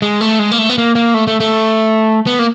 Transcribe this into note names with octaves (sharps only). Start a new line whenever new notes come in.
G#3
A3
G#3
A#3
A3
B3
A#3
A#3
A3
A3
A3
B3
A#3